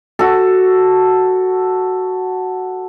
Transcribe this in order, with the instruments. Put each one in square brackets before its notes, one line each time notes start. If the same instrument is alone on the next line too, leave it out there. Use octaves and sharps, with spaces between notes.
[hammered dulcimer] F#4 A4